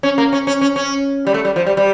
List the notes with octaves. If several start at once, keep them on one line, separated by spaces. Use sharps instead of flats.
C#4
A#3
C#4
C#4
C#4
C#4
G3
A3
G3
F3
G3
G3